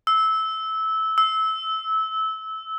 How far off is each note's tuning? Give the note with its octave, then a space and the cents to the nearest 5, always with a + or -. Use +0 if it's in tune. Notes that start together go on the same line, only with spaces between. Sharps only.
E6 -15
E6 -20